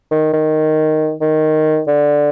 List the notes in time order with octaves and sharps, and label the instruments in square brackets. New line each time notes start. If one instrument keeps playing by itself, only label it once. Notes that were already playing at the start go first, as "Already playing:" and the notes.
[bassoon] D#3
D#3
D#3
D3